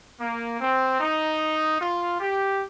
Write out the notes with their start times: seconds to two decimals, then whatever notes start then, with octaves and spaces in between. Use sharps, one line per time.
0.18 A#3
0.59 C4
1.00 D#4
1.80 F4
2.19 G4